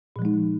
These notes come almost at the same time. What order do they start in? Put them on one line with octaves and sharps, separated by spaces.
A#2 F3 G#3 D#4